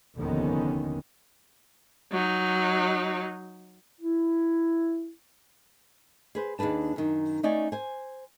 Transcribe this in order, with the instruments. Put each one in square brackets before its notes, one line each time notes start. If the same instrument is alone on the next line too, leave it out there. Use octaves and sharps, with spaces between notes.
[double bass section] F1 D#2 D3 D#3 B3 C#4
[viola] F#3 D#4
[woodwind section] E4
[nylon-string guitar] G#4 B4 C5
D#2 D4 G#4 B4 A5
F#2 D#3
A3 C#4 D#4 D5 G#5
C5 G#5